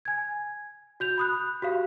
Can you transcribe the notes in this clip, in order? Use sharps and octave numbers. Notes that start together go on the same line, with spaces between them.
G#5 G#6
F#4 G6 F7
B5 D#6 F#6
F#4 G4 F5